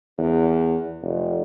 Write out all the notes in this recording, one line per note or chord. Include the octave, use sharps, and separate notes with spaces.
E2
F1